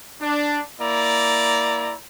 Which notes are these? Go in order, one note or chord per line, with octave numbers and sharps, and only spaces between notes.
D4
A#3 E4 D5 A#5